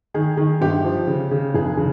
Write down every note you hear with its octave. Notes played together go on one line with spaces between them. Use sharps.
D#3 G#4
D#3 G#4
G1 G4
F3
C#3
C#3
F1 G#4
C#3